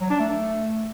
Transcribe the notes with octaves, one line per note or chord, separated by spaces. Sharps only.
F#3
D4
A3